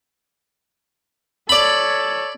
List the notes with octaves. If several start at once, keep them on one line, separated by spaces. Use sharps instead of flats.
A4 C#5 D5 B5